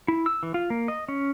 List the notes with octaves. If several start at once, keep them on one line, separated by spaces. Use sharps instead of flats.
E4
E6
E3
F4
A#3
D#5
C#4